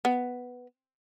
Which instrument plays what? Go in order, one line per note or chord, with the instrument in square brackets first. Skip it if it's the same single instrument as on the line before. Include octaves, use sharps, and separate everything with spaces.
[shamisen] B3